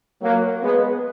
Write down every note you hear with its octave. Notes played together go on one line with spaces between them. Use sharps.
F#3 A#3
G#3 B3